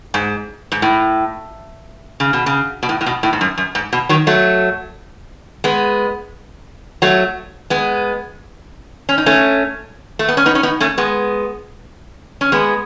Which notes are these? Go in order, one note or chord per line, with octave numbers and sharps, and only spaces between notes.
G#2
G#2
A2
C#3
B2
C#3
B2
A2
A2
B2
A2
G#2
F#2
F#2
G#2
B2
D#3 F#3
F#3 A3
G#3 B3
F#3 A3
G#3 B3
C#4
D#4
A3 C#4
A3
B3
C#4
B3 D#4
C#4
B3 D#4
A3 C#4
G#3 B3
C#4
G#3 B3